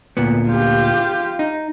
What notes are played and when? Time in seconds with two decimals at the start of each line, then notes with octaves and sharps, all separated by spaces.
0.17 D2 A#2 B3
0.47 F4 G4
1.39 D#4